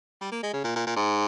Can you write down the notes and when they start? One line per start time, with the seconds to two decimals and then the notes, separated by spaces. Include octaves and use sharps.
0.21 G3
0.32 A#3
0.43 G#3
0.53 C#3
0.64 A#2
0.76 A#2
0.87 A#2
0.96 G#2